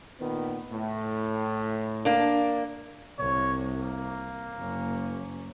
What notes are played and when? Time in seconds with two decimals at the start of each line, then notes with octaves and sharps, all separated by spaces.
0.20 A#2 D#3 B3
0.71 A2
2.05 A#3 D4
3.19 C2 C#5
3.80 A#3
4.56 F#1 C#4